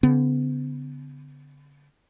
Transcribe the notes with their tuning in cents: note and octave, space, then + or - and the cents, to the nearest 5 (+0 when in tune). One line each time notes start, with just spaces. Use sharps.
D3 -40 B3 +35